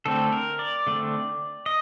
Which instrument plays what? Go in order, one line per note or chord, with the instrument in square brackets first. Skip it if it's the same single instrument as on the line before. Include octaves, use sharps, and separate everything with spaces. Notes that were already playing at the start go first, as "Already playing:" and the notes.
[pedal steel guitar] D3 A3 C4 A4
A#4
D5
D3 A3 C4
D#5